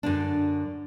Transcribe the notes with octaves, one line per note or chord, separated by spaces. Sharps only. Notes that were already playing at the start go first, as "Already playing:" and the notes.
F#2 D3 D4